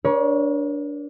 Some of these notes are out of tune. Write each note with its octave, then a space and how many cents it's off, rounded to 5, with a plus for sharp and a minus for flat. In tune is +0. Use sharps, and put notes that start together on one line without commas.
D4 -15 A#4 +45 C#5 +5